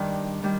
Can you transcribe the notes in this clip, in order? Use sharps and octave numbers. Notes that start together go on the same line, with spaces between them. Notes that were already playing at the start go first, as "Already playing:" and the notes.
Already playing: G2 D#3 G3 D5
D#3 G3